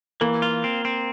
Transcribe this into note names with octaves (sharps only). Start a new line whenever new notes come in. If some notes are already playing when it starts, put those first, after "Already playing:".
E3 A#3
F4
C4
C4